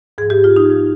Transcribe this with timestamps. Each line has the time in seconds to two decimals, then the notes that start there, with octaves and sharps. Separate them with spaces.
0.18 G#2 F3 G#4
0.30 G4
0.44 F4
0.56 D#4
0.70 F3